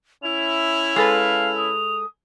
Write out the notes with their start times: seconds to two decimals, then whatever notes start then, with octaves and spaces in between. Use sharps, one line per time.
0.23 C#4 E4 F7
0.96 G#3 A4 B4 F5
1.57 D#6